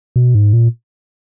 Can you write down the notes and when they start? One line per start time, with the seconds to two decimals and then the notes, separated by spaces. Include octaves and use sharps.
0.16 B2
0.35 G#2
0.53 A#2